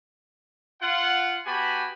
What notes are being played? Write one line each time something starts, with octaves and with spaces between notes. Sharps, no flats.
F4 F#5
B3 F#4 G4 G#5 A5 B5